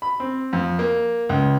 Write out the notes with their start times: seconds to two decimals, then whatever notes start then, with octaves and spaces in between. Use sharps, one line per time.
0.02 B5
0.20 C4
0.53 F2
0.79 A#3
1.29 C#2